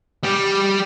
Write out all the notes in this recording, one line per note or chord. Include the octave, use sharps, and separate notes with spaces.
G3 G4